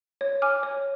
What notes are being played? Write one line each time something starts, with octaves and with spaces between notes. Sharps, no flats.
C#5
G#5 D6 F6
C#5